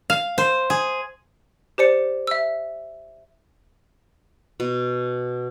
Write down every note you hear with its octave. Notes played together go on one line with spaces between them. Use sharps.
F5
C5
G#4
G4 C5 D5 C#7
E5 E6
B2